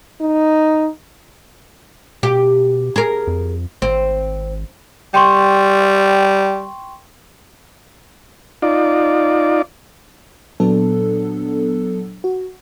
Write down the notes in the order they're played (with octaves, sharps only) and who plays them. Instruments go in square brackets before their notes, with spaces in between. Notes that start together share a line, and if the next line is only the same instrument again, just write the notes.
[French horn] D#4
[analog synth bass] B2 [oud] G4
[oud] G#4 A#4
[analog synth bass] F2
[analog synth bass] G#1 [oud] C4
[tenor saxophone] G3 [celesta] G5 C6 C#6
[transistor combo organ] D#4 F4 D5
[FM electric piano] A#2 F#3 B3 D4 A4
F#4